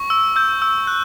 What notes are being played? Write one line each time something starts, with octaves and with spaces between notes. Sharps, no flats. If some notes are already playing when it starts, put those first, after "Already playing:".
Already playing: C#6
E6
E6 G6
E6
F#6